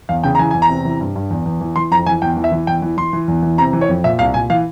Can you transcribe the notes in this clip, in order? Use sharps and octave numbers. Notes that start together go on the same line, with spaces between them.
E2 F5
C#3 G5
A#5
E3 G#5
E2 G#5
A#5
C3
E3
G2
G2
E2
E2
E3
E3 C6
F2 A#5
E3 G#5
E2 G5
E3
E5
E3
E2 G5
E3
E3 C6
E3
E2
E3
C3 A#5
E3
C#5
F2
A#2 E5
C2 F5
A#2 G#5
E3 F5